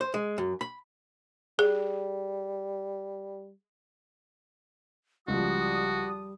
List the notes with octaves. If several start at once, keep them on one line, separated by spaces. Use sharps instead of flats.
C5
G#3
F#2
B5
G3 G#4
C#2 F3 G3 D4 F#4 D#6